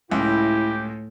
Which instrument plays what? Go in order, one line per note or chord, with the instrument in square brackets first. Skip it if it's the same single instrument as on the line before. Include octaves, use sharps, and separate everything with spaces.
[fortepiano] C#2 [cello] A2 [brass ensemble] E4 [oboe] G4